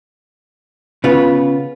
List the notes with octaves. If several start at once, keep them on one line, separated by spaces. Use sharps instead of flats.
C#3 B3 F4